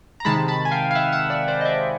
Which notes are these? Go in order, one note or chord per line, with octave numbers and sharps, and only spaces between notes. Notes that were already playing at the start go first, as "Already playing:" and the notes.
A#5
C3 D#3 G#3 A5 B5
A5 B5
G#5
F5 G5
F5
E5 F#5
E5 F#5
D5 E5
C5 D5
D#5
D5 E5